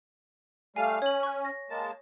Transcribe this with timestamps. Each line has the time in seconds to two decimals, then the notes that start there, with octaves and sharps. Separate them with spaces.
0.76 G3 A3 F5 G#5
1.02 C#4 C#5 F#7
1.23 C#6 F#6
1.45 A#6
1.70 G#3 A#3 A5